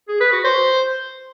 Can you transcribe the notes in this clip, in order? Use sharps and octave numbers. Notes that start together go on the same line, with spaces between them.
G#4
B4
F#4
C5